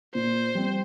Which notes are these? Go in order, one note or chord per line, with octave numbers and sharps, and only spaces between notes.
A#2 C5
G3 C4